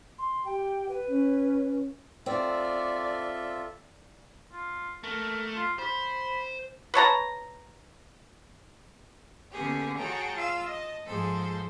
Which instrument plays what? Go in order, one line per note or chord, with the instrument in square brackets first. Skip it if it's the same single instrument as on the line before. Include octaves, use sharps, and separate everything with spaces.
[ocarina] C6
[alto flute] G4 [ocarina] G5
[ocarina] B4
[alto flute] C#4
[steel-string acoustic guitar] C4 [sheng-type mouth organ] F4 A4 E5 [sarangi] D5
[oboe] F4
[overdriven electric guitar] A3 [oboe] A#4
[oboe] F4
[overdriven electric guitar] C5 [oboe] B5
[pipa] B4 C#5 A5 A#5
[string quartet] D3 A#3 B3 C#4 G4 G#4
F#4 G#4 C#5 G5 A5 A#5
F4 F5 E6
D#5 A5
G#2 F3 G#4 A4 C5